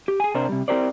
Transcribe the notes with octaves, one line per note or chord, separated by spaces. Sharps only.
G4
G#4 G#5
C3 D4 A#4 C5
C3 G3
C4 E4 G4 A#4 C5 D5